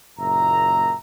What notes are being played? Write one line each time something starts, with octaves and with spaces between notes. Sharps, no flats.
F#1 A#2 E5 A#5